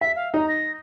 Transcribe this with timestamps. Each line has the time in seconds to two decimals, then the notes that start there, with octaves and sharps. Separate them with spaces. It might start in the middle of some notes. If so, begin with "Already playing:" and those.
0.01 E5 B6
0.16 F5
0.34 D#4 A#5
0.49 A#6